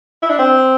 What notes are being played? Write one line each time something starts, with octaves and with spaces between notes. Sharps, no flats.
E4
D4
C4